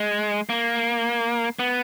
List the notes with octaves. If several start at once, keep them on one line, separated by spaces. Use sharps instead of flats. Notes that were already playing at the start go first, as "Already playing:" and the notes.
Already playing: G#3
A#3
B3